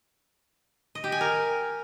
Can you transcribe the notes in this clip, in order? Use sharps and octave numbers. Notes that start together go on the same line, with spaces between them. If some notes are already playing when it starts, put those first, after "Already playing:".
D#5
G4
G#5
A#4